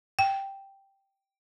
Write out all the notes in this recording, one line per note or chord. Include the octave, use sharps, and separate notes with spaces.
G5